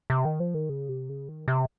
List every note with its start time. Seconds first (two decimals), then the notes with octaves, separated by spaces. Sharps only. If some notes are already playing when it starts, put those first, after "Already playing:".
0.10 C3
0.25 D#3
0.40 F3
0.54 D#3
0.69 C#3
0.89 C3
1.09 C#3
1.29 D#3
1.48 C3